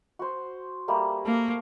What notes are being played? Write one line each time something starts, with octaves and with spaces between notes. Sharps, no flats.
F#4 C5
G3 A3 A#3
A#3 A4